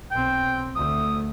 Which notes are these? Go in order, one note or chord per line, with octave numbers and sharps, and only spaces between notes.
B1 C4 G5
D2 A3 D#6